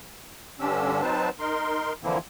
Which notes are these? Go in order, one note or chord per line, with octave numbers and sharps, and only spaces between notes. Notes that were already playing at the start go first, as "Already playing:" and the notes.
G2 D3 C#4 D4 G4 E6
F#3 C4 D#4 B4 C5 A5
D#4 A#4 C6
D3 E3 F3 A#3 C4 E4